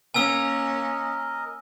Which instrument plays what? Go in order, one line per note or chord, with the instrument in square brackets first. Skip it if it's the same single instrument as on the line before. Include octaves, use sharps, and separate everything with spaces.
[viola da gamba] A#3 C#4 [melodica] A#4 D#5 [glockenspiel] G#5 E6